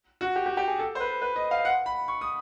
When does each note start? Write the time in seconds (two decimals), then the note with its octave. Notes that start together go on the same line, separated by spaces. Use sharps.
0.21 F#4
0.36 G4
0.46 G4
0.57 G4
0.68 G#4
0.79 A4
0.95 C5
1.00 B4
1.22 B4
1.36 D#5
1.51 F5
1.65 F#5
1.86 B5
2.08 C#6
2.21 D#6